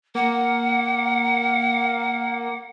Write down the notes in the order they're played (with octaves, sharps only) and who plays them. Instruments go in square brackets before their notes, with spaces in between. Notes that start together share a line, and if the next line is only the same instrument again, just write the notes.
[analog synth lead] A#3 [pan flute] F#5